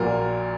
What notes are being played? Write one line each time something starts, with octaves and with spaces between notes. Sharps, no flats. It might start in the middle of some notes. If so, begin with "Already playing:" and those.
Already playing: A#1 A#2 F#3 A#4